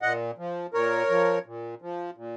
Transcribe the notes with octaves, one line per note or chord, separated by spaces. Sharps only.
A#2 D#5 F#5
F3
A#2 A#4 C#5
F3
A#2
F3
A#2